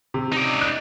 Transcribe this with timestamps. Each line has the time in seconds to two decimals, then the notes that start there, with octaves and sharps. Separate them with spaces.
0.14 C3
0.32 D#4 D5
0.61 F#6